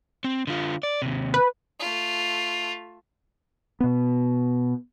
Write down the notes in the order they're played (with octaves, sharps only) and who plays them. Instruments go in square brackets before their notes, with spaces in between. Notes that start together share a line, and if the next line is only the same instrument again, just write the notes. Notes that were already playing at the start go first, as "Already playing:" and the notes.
[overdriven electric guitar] C4
D3 F4
D5
D#2 C3
[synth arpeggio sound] B4
[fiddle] A3 F4
[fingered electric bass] B2 B3